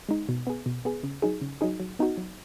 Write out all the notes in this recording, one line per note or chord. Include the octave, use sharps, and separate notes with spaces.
G#3 D#4
B2
B3 G#4
B2
B3 G#4
C#3
F#3 D#4 G#4
C#3
F#3 D#4 G#4
F#3
B3 D#4 F#4
F#3